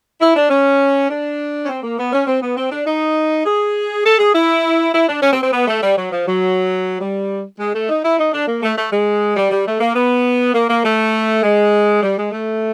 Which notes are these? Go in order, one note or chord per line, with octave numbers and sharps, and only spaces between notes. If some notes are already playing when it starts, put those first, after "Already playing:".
E4
D4
C#4
D4
C#4
C4
A#3
B3
C#4
C4
B3
C4
D4
D#4
G#4
A4
G#4
E4
E4
D4
C#4
C4
C4
B3
A3
G3
F#3
F3
F#3
G3
G#3
A3
D#4
E4
D#4
D4
A#3
A3
A3
G#3
G3
G3
A3
A#3
B3
A#3
A#3
A3
G#3
G3
G#3
A3